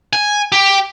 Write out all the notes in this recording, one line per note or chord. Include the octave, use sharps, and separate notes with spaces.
G#5
G4